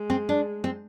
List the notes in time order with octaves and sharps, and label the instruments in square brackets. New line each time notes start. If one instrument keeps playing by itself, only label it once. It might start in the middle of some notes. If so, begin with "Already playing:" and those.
Already playing: [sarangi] G#3
[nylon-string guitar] C4
D4
C4